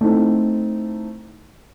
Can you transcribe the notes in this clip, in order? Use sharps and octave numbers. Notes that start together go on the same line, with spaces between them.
A3 C4 D#4 E4